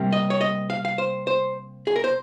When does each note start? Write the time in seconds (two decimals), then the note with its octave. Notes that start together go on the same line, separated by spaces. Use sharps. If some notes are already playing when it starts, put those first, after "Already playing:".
Already playing: C3 G3 A#3
0.12 D#5
0.30 C#5
0.41 D#5
0.70 F5
0.85 F5
0.98 C5
1.27 C5
1.87 G#4
1.96 A#4
2.04 C5